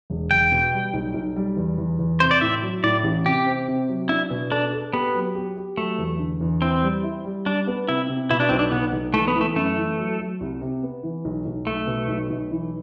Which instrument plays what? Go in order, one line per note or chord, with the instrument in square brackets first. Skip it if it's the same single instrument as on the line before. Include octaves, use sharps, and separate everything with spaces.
[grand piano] E1
[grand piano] E1 [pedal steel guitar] G5
[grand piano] B2
G3
B1
B1
G3
E2
E2
E2
[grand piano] C3 [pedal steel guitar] C5
[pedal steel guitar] D5
[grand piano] A2 [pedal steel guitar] E5
[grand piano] F#3
[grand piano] A2 [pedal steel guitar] D5
[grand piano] A1
[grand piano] C3 [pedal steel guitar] G4
[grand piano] C4
C3
F#3
[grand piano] D4 [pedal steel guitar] E4
[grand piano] B2
[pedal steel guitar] D4 [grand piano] A4
[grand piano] A4
[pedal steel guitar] B3 [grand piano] G4
[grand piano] F#3
G4
G4
[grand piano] F#3 [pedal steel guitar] A3
[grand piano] E2
D3
E2
[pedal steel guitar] C4 [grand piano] E4
[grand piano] G3
E4
G3
[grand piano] G3 [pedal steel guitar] D4
[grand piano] B3
[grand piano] C3 [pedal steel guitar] E4
[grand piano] C3
[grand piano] B2 [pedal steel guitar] E4
[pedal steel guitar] D4
[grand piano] B1 [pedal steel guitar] C4
[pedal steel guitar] D4
[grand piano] B1 [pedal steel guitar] B3
[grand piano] B1
[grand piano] E3 [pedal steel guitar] A3
[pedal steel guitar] B3
[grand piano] E3
[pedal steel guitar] A3
[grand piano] F#2 [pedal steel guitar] A3
[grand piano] E3
F#3
F#3
C2
C3
B3
E3
B1
B1
[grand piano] B1 [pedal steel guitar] A3
[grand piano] B2
B1
B1
E3